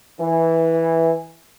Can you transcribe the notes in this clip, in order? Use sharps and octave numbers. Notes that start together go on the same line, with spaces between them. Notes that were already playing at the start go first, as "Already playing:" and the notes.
E3